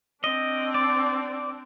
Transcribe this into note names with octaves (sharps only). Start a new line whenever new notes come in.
C4 D4 D#5
D5